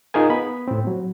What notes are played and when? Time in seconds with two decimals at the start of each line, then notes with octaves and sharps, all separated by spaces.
0.14 D#4 F4 G#4 A#4 G#5
0.30 B3 B5
0.68 A2 C4
0.87 F#3